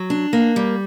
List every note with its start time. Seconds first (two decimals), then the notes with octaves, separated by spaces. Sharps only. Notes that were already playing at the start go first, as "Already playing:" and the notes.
Already playing: F#3
0.10 D4
0.33 A#3
0.56 G3